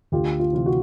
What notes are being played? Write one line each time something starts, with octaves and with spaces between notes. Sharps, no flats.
D2 F4 G4
F4
C3 E3 F4
F#4